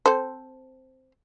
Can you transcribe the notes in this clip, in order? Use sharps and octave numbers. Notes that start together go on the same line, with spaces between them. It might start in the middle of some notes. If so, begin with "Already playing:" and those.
C4 A4 C5